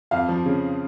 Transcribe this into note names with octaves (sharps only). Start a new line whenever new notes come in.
F2 F5
F3
C#3